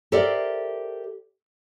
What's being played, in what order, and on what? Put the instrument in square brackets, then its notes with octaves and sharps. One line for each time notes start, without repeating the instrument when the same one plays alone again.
[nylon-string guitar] G4 A4 A#4 C5 D5 E5